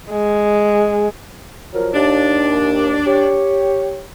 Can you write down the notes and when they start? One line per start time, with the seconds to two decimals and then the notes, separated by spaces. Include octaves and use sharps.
0.11 G#3
1.74 F3 F#3 A#4
1.94 D#2 D4
3.07 G4 C#5